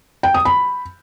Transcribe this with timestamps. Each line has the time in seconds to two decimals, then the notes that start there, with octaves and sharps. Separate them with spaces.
0.23 G5
0.34 D#6
0.45 B5